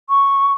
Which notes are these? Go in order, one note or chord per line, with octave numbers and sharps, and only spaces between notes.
C#6